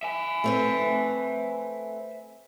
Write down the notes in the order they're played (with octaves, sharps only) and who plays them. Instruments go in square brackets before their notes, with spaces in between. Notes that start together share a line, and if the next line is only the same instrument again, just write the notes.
[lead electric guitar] E5 G#5
[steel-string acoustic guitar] A3 C4 B4